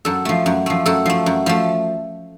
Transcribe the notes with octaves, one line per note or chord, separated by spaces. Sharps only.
F#2 A4
F3 A3
F#2
F3 A3
F#2 A4
F3 A3
F#2
F3 A3